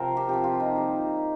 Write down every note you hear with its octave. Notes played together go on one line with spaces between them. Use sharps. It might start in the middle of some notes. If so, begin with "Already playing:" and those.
Already playing: C3 F3 C4 A#4 C5
G4
C3 F3 C4 G4
F4
D#4
D#3 G3 A#3